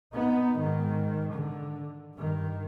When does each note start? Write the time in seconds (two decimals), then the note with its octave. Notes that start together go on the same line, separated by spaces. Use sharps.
0.14 B3 D#4
0.59 G#2 D#3
1.34 D3
2.16 G2 D#3